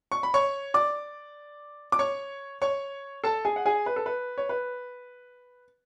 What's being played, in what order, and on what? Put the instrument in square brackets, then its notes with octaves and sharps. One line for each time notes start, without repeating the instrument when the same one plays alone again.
[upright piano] C#6
B5
C#5 C#6
D5 D6
D6
C#5 C#6
C#5 C#6
A4 A5
G#4 G#5
F#5
G#4 G#5
B4
A4
B4
C#5
B4